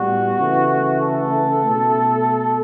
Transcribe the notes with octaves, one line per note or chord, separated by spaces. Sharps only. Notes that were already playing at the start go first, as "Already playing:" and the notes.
Already playing: A2 G3 B3 F#4
C#3 E3 A3
A4
B2 A3